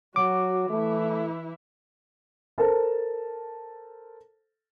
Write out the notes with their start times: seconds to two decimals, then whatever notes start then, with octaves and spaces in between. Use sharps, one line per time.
0.16 F#3 F#4 D6
0.70 E3 A3 E4
2.58 A4 A#4 C5 A5